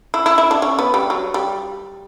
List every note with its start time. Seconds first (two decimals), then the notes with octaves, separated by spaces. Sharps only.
0.14 E4
0.26 E4
0.38 E4
0.51 D4
0.62 C#4
0.79 B3
0.94 G3
1.10 F#3
1.34 G3